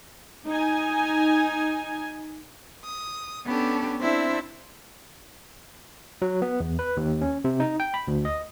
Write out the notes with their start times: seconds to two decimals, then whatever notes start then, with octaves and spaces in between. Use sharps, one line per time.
0.47 D#4 G#5
2.85 D#6
3.45 B3 C#4 D4 G4 A4
4.00 C4 D4 E4 C5 E5
6.22 F#3
6.42 B3
6.60 E2
6.79 B4
6.97 D#2
7.21 C#4
7.44 C3
7.60 D#4
7.80 G5
7.94 B5
8.08 D2
8.25 D#5